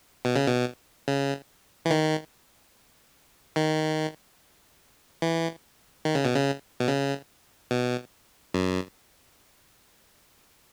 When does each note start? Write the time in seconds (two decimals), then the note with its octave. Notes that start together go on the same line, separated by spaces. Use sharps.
0.25 B2
0.36 C#3
0.46 B2
1.08 C#3
1.85 E3
1.90 D#3
3.56 D#3
5.22 E3
6.05 D#3
6.15 C#3
6.25 B2
6.35 C#3
6.80 B2
6.88 C#3
7.71 B2
8.54 F#2